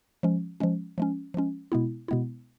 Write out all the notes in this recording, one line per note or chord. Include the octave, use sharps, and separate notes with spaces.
F3 G#3 C#4
F3 G#3 C#4
F3 G#3 C#4
F3 G#3 C#4
B2 G#3 B3 E4
B2 G#3 B3 E4